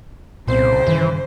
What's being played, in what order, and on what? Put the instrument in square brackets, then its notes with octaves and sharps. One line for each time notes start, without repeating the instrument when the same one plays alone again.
[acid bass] C2 [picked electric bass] A#2 B3 C4 [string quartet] C#3 C5
[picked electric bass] G2 D#3 [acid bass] E3